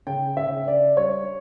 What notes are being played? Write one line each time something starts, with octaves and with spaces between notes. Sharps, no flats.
C#3 G5
C#3 E5
D4 D5
G3 C#5